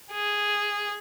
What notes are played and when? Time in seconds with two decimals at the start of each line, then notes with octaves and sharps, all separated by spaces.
0.12 G#4